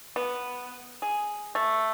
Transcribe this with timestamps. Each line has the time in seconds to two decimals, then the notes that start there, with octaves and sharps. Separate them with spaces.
0.16 B3
1.02 G#4
1.55 A3